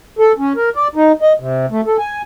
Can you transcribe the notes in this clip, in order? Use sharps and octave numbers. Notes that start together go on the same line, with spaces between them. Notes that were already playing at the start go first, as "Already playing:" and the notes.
A4
C#4
A#4
D5
D#4
D#5
C3
A3
A4
G#5